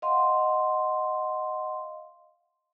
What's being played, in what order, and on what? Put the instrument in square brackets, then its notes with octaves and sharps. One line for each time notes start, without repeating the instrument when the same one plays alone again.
[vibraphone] D#5 F5 F#5 C6